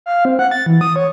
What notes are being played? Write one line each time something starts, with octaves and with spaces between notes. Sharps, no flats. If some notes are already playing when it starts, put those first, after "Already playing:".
F5
C4
F#5
A6
E3
D#6
C#5